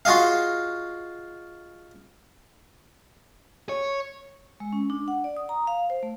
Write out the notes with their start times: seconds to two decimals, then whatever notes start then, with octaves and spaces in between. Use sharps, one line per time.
0.05 F4 F#4 G#4 D#5 F5
3.69 C#5
4.60 G#3
4.73 C#4
4.90 D4
5.08 F#5
5.24 D5
5.36 D#6
5.49 A#5
5.67 F5
5.90 C5
6.03 A3